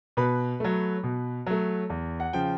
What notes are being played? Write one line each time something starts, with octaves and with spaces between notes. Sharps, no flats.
B2 B4 B5
F#3 A3
B2
F#3 A3
E2
F#5
C#3 F3 G5